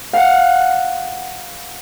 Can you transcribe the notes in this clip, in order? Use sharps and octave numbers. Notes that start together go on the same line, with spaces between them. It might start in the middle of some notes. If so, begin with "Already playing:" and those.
F5 F#5